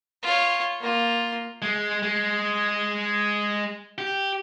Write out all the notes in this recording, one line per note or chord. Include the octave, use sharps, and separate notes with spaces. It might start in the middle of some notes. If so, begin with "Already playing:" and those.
F4 C#5
A#3 F4
G#3
G#3
G4